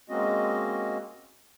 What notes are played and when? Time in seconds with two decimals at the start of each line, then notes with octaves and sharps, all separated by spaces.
0.09 G#3 A#3 C4 C#4 F#4 D#5